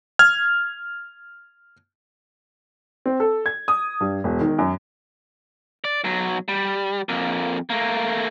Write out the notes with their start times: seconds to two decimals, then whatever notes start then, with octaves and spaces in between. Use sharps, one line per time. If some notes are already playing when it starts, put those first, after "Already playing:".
0.19 F6 G#6
3.06 C4
3.20 A4
3.46 G#6
3.68 D#6
4.00 G2
4.24 E1
4.41 D#3
4.58 F#2
5.84 D5
6.04 B1 F#3
6.48 G3
7.09 F2 A#3
7.70 A3 A#3